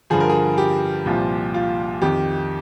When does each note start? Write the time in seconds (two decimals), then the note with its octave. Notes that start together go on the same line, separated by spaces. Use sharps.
0.10 G2 D3 F3 G#4
0.20 A#4
0.29 G#4
0.58 G4
1.06 C2 A#2 F3
1.54 F4
2.01 F2 D#3 G4